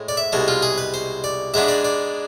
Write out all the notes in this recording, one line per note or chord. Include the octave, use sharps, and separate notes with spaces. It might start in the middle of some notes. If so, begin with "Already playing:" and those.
Already playing: A2 G#3
D5
E5
C2 B2 G#3 A4
F4
G#4
B4
C5
D5
G#2 G#3 B3 D4 E5
D5
D5